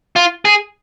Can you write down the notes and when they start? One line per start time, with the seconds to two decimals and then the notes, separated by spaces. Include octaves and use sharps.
0.16 F4
0.45 G#4